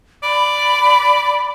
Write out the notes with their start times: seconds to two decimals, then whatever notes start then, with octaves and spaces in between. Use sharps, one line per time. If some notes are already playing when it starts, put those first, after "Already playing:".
0.23 D5 B5